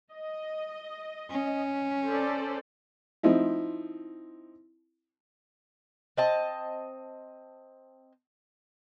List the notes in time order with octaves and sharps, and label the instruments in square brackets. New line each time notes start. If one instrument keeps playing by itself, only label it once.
[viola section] D#5
[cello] C#4
[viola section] A4 C5 D5
[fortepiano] F3 C4 D#4 E4
[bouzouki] C4 D#5 A5